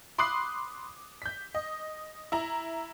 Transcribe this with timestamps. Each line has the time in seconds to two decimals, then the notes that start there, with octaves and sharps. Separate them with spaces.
0.18 B5 C6 D6 D#6 F#6 C7
1.22 G6 B6
1.55 D#5
2.32 E4 A#5